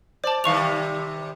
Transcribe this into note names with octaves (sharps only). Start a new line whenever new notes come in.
C5 D5 A5
C3 D#3 G3 F5 C#6 F7